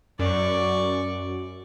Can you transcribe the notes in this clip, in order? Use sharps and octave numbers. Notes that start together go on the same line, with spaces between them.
F#2 D5 C#6